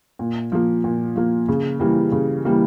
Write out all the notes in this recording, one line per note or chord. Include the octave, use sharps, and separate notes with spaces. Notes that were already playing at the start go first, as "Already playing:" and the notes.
A#2
F3 A#3
A#2
F3 A#3
C#3
E3 G3 A#3
C#3
E3 G3 A#3